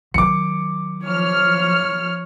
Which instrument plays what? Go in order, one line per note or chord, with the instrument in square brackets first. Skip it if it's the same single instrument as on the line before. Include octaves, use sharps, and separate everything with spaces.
[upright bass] D#3 F#3 [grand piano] D6 C#7
[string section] F3 F6 [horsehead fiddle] C#5